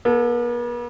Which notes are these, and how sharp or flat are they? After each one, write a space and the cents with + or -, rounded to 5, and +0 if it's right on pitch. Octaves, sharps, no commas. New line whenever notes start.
B3 -45 A4 +0